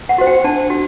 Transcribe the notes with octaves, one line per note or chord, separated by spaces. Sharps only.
F#5
F#4 C5
G5
D4 A5
F#4